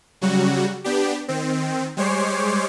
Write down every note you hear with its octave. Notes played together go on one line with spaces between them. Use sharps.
C#3 F#3 G3 F#4
B3 D4 G4
D#3 C4
G3 G#3 C5 C#5 D6 C7